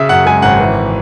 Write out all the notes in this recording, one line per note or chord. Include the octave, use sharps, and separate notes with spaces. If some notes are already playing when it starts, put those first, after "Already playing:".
Already playing: C#3 E5
F#2 F#5
G#3 G#5
G#1 F#5
E3